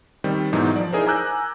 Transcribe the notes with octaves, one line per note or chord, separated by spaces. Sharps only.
D#3 G3 C4
G#2 B2 E3 F#3 D#4
F3 D5
D#4 E4 G#4 A#4 C5
G#5 A#5 D6 E6 F#6 G6